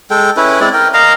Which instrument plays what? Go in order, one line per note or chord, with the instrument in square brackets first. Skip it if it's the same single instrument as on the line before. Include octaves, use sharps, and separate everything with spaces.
[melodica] G#3 A4 G5
C#4 E4 B4
G#3 C4 E4 D5
A#4 G5
A#4 D#5 F5 A#5